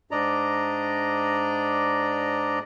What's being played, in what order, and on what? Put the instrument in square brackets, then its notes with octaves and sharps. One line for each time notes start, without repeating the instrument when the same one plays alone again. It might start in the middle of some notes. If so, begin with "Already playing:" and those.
[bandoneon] G#2 D4 D5 D#5 A#5